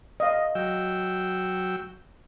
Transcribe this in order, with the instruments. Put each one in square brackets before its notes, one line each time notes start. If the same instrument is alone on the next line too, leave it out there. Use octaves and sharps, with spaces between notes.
[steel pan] D#5 F5
[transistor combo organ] F#3 G5 E6